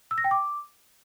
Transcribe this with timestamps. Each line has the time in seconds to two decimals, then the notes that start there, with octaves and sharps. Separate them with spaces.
0.11 E6
0.18 A#6
0.24 G5
0.31 D6